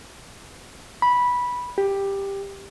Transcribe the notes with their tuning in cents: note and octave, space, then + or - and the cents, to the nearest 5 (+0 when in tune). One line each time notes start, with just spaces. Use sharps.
B5 -10
G4 +10